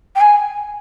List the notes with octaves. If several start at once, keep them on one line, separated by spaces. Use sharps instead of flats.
G5
G#5